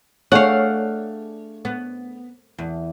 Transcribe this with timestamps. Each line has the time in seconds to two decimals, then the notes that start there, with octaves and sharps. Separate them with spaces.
0.32 A3 D4 G#4 C#5 F5 F#5
1.65 B3
2.58 E2